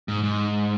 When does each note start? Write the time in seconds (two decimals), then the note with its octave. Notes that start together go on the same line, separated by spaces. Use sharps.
0.08 G#2
0.24 G#2